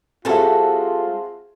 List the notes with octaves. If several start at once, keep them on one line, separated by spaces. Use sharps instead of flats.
G3 C4 F4 F#4 G#4 A4 E5 A5